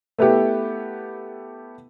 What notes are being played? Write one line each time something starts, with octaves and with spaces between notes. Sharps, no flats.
A3 B3 E4 G4